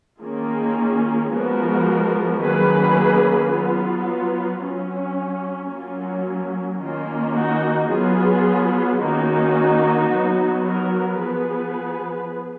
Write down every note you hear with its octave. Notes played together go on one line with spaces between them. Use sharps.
D#3 A#3 C#4 F4 G#4
F3 G#3 B3 F#4 A#4
D#3 F#3 A#3 C#4 G#4 B4
F#3 B3 F4
F4
F#3 C#4
F#3 A#3 C#4 F4
D#3 A#3 C#4 F4
D#4 F#4
F#3 B3 F4 G#4
D#3 A#3 C#4 D#4 F#4
F#3 B3
F#4 A#4
F3 B3 G#4 B4